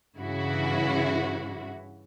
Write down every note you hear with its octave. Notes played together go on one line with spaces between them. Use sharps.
G2 C#3 E3 E4 F#4